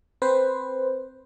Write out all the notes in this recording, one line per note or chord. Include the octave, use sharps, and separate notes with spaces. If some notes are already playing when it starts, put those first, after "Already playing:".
C4 B4 C5